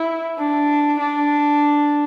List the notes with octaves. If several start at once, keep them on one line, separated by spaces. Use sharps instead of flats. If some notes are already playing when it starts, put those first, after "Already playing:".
Already playing: E4
D4
D4